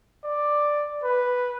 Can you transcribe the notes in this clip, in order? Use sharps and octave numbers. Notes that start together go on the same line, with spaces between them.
D5
B4